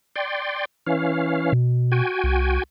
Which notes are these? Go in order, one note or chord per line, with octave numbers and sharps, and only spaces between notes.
D5 G5 C6
E3 C#4 F5
B2
F#4 G5 G#5
C2